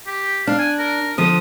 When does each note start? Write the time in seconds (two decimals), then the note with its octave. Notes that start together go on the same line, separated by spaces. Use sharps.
0.07 G4
0.47 D4 F5
0.59 G#5
0.79 A#4
1.18 D3 F3 D#6